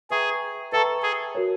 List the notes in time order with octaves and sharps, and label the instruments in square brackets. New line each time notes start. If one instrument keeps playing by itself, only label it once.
[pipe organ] G#4 [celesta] B4 E5 G5 A#5 C#6
[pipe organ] A4 [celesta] B4 E5 G5 A#5 C#6
[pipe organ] G#4
[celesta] F#4 A#4 C#5